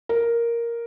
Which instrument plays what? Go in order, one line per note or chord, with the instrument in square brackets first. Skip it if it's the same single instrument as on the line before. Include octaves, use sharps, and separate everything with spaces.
[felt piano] A#4